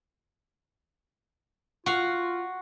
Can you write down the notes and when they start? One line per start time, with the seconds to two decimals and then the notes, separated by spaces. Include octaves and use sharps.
1.86 F4 F#4 F5